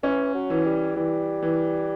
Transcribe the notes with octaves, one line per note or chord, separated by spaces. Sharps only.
E3 C#4
F#3
E3
G3
E3 G3
E3